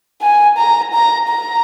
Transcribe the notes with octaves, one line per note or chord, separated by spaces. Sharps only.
G#5
A#5
A#5
A#5